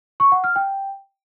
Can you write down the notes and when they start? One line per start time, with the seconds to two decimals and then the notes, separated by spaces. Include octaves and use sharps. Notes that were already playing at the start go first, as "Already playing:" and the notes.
0.20 C#6
0.32 F#5
0.44 F6
0.56 G5